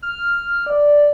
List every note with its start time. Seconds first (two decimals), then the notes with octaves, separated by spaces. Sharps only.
0.02 F6
0.66 D5